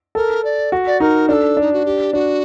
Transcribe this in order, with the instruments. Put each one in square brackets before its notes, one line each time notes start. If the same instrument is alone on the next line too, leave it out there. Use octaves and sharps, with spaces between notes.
[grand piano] A4 [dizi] A#4
[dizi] D5
[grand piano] F#4
[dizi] D5
[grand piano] D#4 [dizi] A#4
[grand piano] D4 [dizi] A4 A#4
[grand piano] D4 [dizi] D#4
[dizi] F#4
G4
[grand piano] D4 [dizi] F#4